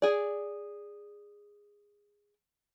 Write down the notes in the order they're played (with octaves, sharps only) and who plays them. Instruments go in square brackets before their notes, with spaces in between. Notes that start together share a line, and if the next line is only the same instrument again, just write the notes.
[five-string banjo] G#4 D5